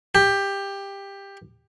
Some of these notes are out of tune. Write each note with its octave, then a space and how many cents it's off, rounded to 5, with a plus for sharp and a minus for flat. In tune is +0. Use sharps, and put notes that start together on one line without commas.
G4 +15